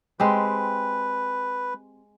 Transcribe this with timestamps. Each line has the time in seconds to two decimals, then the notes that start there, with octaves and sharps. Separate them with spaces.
0.20 G#3 C4 G4 B4